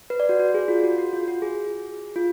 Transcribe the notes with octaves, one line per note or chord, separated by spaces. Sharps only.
B4
D5
F#4
F#4
G#4
F4
F#4
F#4
F4
F#4
G#4
F4